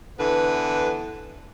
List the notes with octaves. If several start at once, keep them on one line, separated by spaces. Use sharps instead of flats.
D3 E3 B3 B4